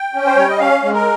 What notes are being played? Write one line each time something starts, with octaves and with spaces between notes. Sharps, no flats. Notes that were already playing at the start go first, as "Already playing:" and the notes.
Already playing: G5
C#4
C5
G3 C#5
D#5
C#4 F5
G#3
A#4